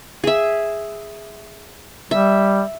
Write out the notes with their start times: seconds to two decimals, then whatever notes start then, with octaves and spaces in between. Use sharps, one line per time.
0.24 G#4 E5
2.11 G3 E5